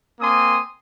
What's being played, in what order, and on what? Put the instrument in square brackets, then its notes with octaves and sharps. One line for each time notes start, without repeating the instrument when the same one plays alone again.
[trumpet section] A#3 C4 G#5 C6 D#6